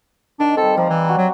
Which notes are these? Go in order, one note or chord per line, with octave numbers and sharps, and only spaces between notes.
D#3 D4
G3 C4 A4
F3 D5 F5 A#5
E3
F#4 A#5
F#3